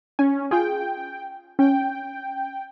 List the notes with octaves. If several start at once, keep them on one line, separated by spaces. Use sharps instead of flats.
C#4 G#5
F4 G#4 G5
C#4 G5